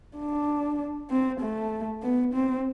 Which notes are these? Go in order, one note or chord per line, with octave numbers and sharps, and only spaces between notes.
D4
C4
A3
B3
C4